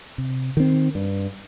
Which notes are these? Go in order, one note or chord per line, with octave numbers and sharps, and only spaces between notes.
C3
D#3 C4
G2